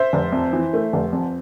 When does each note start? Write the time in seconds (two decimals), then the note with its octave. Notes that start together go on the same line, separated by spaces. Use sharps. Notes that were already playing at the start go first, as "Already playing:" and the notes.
Already playing: C5 E5
0.13 F1
0.33 F2
0.53 E3
0.73 A3
0.93 F1
1.13 F2